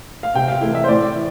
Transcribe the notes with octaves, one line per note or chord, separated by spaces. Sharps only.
F5
C3 G5
F5
E3 A3 E4
E5
C5
A2 D5
E3